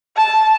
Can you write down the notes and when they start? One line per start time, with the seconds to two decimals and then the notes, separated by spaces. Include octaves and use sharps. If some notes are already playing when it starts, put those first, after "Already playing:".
0.17 A5